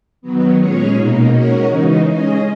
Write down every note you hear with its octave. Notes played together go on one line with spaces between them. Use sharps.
D#3 F#3 B3
A#2 G#3 C#4 G#4 C#5
B2 A#3 D#4
G#3 C#4 F#4 A#4 C#5
C#3 E3 G#3 D#4
G#3 C#4 G#4 D#5